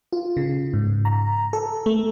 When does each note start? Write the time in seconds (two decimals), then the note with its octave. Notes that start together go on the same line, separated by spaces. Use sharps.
0.13 F4
0.37 C#3
0.73 G#2
1.05 A#5
1.53 A4
1.86 A3